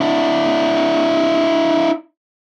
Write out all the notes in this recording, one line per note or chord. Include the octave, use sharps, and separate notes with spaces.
D4 E4